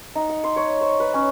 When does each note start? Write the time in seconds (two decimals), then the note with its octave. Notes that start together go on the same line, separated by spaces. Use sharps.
0.15 D#4
0.30 F#5
0.44 C6
0.56 C#5
0.81 C5
1.00 B4
1.14 C#4